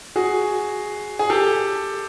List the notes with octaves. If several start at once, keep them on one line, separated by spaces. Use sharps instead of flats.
F#4 G#4
G#4
G4 A4